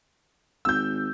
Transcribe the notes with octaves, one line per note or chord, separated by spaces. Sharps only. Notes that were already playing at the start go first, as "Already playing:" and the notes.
G#1 E6 G6